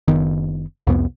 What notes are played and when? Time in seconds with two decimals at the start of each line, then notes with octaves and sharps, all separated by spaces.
0.08 F#1 D#3 B3
0.87 C2 F2 B3